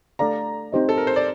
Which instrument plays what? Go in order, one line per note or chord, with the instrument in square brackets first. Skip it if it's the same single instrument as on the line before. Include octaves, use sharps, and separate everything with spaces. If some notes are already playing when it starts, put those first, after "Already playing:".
[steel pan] A3 D4 A4 D5 F5 [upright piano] A#5
[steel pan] C4 D#4 G4 C5 D#5
[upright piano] A4
A#4
C5
D5